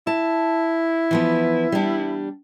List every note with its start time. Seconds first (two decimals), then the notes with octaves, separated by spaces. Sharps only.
0.07 E4 A5
1.11 E3 F3 B3
1.72 G3 D4